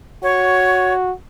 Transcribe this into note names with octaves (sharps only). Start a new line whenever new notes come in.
F#4 C#5